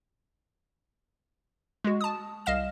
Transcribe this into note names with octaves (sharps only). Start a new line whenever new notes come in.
G#3 F#4
A5 D#6
C2 D#5 F5 F6 E7